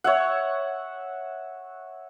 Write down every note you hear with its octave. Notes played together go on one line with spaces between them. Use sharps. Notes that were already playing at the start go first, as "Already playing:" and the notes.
C#5 E5 F#5